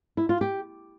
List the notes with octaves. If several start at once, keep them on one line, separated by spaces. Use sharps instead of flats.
E4
F4
G4